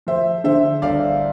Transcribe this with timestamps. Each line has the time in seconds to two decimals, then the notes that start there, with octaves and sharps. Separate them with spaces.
0.07 F3 C5 E5
0.44 D3 C5 E5
0.82 G1 D5 F5